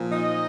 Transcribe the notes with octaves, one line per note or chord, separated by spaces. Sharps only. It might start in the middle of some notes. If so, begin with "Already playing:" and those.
Already playing: A#2 F3
D#4 D#5